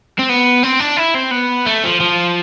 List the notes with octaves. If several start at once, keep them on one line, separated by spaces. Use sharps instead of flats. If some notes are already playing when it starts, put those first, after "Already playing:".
C4
B3
C4
D4
E4
C4
B3
A3
F3
F3